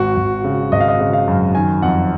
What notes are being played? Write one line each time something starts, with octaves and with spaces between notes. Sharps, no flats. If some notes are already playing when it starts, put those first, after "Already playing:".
Already playing: G#1 F#4
G#1
C#3
G#1 D#5
F5
D#5
C#3
F5
F#2
D#3 G#5
F2 F#5